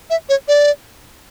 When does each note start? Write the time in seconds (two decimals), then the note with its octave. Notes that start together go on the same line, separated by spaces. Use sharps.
0.10 E5
0.29 C#5
0.48 D5